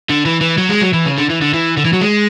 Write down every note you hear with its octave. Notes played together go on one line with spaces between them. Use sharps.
D3
E3
E3
F#3
G#3
F#3
E3
C#3
D3
E3
D3
E3
D3
E3
F#3
G#3